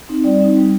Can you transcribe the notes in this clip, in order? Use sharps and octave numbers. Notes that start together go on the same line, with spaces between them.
C4 D#4
G3 D5
C4 D#4
G3